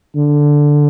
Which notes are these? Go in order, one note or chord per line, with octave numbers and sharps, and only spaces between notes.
D3